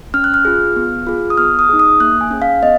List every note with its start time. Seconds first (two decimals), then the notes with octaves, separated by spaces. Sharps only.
0.14 C#4 F6
0.24 F#6
0.34 F6
0.45 F4 G#4
0.76 B3
1.07 F4 G#4
1.30 D#6
1.37 B3 F6
1.59 D#6
1.69 D#4 G#4
1.79 D#6
2.00 A#3 F#6
2.21 G#5
2.31 C#4 G#4
2.42 F5
2.63 B3 D#5